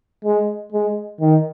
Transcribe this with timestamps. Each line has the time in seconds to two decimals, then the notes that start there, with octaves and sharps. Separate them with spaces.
0.24 G#3
0.72 G#3
1.21 D#3